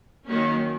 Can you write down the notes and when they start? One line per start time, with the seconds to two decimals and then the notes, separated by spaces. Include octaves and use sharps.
0.25 D#3 F#3 A#3 C#4